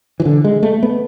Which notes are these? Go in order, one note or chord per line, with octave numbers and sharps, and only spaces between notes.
E3
D3
G#3
A3
B3